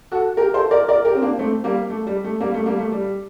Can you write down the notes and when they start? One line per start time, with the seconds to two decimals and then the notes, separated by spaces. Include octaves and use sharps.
0.12 F#4 A4
0.37 G4 A#4
0.54 A4 C5
0.71 A#4 D5
0.88 A#4 D5
1.05 G4 A#4
1.15 C4
1.22 A#3 D4
1.39 A3 C4
1.64 G3 A#3
1.90 A3
2.07 G3
2.24 A3
2.40 G3 A#3
2.54 A3
2.66 G3 A#3
2.79 A3
2.92 G3